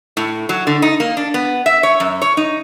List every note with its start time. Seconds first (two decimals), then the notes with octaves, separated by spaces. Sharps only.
0.17 A2
0.49 F#3
0.67 D3
0.82 D#4
1.00 A#3
1.17 D4
1.34 B3
1.66 E5
1.83 C#5
2.00 F#2
2.22 C#5
2.37 D#4